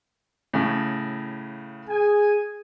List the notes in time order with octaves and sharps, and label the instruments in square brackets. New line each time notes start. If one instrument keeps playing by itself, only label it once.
[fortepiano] A2 C#3
[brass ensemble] G#4 G#5